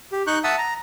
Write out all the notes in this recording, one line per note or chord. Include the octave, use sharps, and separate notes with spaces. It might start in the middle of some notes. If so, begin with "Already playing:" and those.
G4
D#4 C#6 F#6 G6
E5 F#5 A5 D#6 E6
A#5